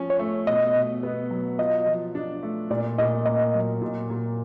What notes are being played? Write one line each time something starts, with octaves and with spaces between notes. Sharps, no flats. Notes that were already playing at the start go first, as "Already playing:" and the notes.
Already playing: F3 C#4
C#5
A3
B2 D#5
B2
B3
F#3
F4 D#5
F3
D4
A3
A#2 D5
A#2 D#5
A#3 D#5
F#3
A#2
A#2